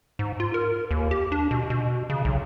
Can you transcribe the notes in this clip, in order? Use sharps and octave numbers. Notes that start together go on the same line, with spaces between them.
G#2
F4
A#4
D#2
G4
D4
B2
B2
C#3
B1